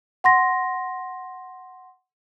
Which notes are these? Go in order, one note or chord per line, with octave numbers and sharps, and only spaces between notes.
F#5 C6 A#6